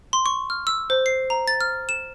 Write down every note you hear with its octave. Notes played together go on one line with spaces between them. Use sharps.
C6
C#6
F6
E6
C5
C7
A#5
A6
F6
E7